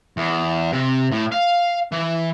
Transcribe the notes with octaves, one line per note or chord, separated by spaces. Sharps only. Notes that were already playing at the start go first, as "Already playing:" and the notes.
E2
C3
A2
F5
E3